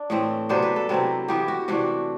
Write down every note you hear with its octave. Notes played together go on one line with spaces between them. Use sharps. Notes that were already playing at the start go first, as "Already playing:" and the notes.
Already playing: D4
A2 E3 A3 C4
C3 F#3 B3 D4 C5
B4
A4
C3 F#3 C4 E4 B4
E3 B3 E4 G4
F#4
C3 E3 A3 D4 F#4